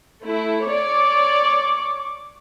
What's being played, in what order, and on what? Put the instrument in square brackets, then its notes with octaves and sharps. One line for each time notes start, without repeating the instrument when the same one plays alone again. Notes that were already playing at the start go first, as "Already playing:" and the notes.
[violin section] A3 E4
[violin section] C#5 D5 [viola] C#6 D6